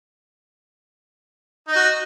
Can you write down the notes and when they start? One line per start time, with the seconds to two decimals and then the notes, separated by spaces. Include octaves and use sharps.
1.68 D#4
1.72 D#5
1.76 F#4